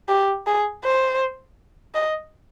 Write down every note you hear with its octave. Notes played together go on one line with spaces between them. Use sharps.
G4
G#4
C5
D#5